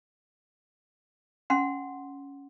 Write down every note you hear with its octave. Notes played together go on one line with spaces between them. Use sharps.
C#4 F#5 C6